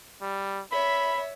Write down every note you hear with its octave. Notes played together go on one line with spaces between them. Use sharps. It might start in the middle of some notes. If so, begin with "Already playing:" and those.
G3
C#5 E5 B5